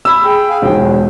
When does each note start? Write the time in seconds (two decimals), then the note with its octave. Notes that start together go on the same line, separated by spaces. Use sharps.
0.05 B5 E6
0.24 G#4 G5
0.50 F5 G#5
0.62 E1 G#2 F3 G5
0.78 D3